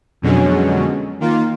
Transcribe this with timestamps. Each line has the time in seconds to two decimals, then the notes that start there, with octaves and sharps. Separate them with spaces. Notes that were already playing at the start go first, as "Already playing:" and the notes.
0.22 F2 B2 D3 F#3 G#3 C#4
1.20 D#3 A#3 F4